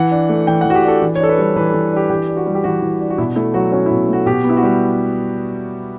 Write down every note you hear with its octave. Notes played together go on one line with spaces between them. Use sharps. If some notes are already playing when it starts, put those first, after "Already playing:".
Already playing: E3 F#5
D4
A3
E3 G5
F#5
E3 F#4
G4
D4 A4
E3
C#5
D4 A4
B4
G3 C#5
E3 B4
A4
E3
D4 G4
E3 G4
D4
F#4
G3
G4
E3 F#4
E3
D4
F#4
B2 E4
A3 E4
F#3 F#4
C#4 F#4
E4
B2
A3 F#4
B2 G4
B3
E4
F#4
G3 G4